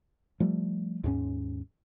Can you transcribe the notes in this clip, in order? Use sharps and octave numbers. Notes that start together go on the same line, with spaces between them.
F3 G3 A3
D#2 G#2 C#4